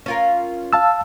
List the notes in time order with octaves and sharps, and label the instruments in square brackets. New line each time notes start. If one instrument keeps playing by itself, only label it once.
[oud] C#4 F4 A#4
[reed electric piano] F5 A5 E6